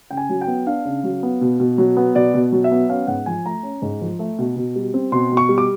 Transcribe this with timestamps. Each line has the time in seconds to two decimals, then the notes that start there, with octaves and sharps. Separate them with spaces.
0.11 C#3 G5
0.17 G#5
0.29 F#3
0.41 G5
0.47 B3
0.67 D4 F5
0.85 C#3
1.04 F#3
1.23 B3
1.41 B2
1.60 B2
1.78 F#3
1.97 B3
2.15 B2 D5
2.34 B2
2.52 F#3
2.64 E5
2.71 B3
2.89 C#4 F5
3.07 G#2 F#5
3.26 F3 G#5
3.45 A3 A#5
3.63 C#4
3.82 G#2
4.01 F3
4.19 A3
4.39 B2
4.56 B2
4.76 G3
4.94 C4
5.12 B2 C6
5.31 B2
5.37 C#6
5.49 G3
5.58 D6